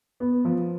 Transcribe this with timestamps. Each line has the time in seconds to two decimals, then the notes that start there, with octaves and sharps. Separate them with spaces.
0.20 B3
0.45 F3